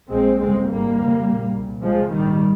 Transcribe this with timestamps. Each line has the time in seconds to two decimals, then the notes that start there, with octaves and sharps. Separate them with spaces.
0.12 A#1 A#2 G#3 C4
0.40 G1 F2 C#3 G#3 C4
0.69 G#1 G#2 G3 A#3
0.97 F1 D#2 C#3
1.26 A#1 A#2
1.54 C2 A#2
1.82 C#2 C3 F3 G#3
2.10 A#1 G#2 D#3 G3